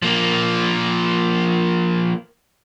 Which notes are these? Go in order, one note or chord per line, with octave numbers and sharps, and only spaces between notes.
F3 A#3